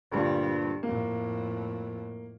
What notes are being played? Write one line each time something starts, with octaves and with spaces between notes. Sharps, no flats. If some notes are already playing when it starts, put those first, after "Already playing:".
D2 G2 A#2 G3
F2 A2 A#3